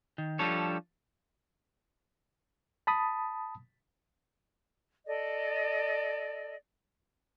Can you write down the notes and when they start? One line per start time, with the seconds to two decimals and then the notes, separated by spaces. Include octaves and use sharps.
0.18 D#3
0.39 F3 G3 D4 A4 C#5
2.87 A5 B5 D#6
5.07 A4 D5 D#5